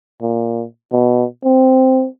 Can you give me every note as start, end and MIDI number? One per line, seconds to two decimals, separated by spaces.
0.21 0.65 46
0.92 1.25 47
1.44 2.07 60